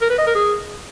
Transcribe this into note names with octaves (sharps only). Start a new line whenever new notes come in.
A#4
B4
D#5
A#4
G#4